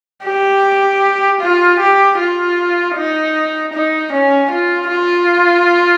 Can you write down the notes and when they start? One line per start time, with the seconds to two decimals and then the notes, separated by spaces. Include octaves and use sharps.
0.25 G4
1.40 F4
1.79 G4
2.19 F4
2.96 D#4
3.73 D#4
4.12 C#4
4.51 F4
4.89 F4